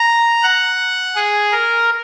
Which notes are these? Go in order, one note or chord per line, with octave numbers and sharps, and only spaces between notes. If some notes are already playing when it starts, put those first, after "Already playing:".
Already playing: A#5
F#5
G#4
A#4